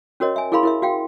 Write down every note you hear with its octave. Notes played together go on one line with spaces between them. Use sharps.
C#4 F#4 A#4 C#5 D#5
E5 G#5
E4 G#4 A#4 F5 B5 C6
E4 A#4 E5
F#4 F5 G5